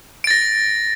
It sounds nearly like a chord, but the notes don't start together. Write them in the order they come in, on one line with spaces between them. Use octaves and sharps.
D7 A6 A#6